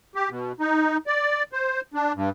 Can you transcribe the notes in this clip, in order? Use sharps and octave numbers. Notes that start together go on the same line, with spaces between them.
G4
B2
D#4
D5
C5
D4
G2